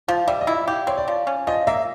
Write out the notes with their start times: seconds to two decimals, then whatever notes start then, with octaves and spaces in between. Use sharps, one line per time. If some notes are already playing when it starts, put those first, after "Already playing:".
0.08 F3 F5
0.28 G3 E5
0.41 D#5
0.47 E4
0.54 E5
0.68 G4 F5
0.87 C4 C#5
0.97 D5
1.08 F3
1.27 C#4
1.47 F3 D#5
1.67 A#3 E5